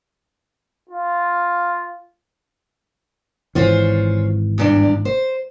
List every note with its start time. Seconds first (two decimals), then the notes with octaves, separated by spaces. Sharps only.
0.89 F4
3.55 G#1 E3 C#4 F4 C5
4.58 E2 G2 D4
5.05 C5